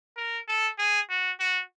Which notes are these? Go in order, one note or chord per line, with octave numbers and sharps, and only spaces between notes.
A#4
A4
G#4
F#4
F#4